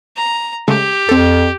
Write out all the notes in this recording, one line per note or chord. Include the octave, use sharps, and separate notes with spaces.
A#5
C#3 G#3 A3 G4
F2 C4 A4